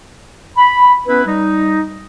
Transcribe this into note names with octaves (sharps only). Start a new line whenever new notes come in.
B5
B3 C#4 E4 B4
G3 D#4